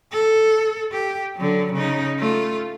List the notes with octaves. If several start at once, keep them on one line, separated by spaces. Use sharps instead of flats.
A4
G4
D3 F#3
C#3 D#4
A3 F4